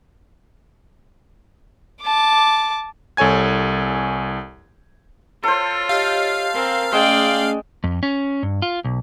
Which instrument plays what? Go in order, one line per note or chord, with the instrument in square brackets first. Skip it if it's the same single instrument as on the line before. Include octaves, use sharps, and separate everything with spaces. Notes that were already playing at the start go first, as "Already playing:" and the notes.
[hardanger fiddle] A5 D6
[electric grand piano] C2 A4 C#5 G#5 G#6
[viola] F4 [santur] A4 C5 [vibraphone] C#5
[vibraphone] G4 C#5 D#5 [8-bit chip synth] F5
[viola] C4 [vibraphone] A#4 G#5 A#5
[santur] G#3 [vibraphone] A3 C#4 G#4 [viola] D5 G5
[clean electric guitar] F2
C#4
G2
F4
B1